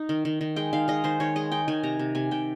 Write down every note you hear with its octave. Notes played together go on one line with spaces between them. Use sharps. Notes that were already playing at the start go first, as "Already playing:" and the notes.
Already playing: D#4
D#3
D#3
D#3
G#3 G5
D#3 F5
G#3 D#5
D#3 C5
D#3 C#5
G#3 D#5
D#4 G5
D#3 G#5
C3 A#5
C3
C3 G#5
C3 G5